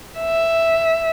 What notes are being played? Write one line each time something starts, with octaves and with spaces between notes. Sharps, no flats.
E5